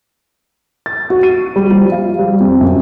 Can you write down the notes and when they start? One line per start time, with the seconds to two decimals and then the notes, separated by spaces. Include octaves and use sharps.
0.86 A6
1.10 F#4
1.23 D#7
1.56 G3
1.71 F3
1.92 F5
2.19 G3
2.40 F2
2.61 F#2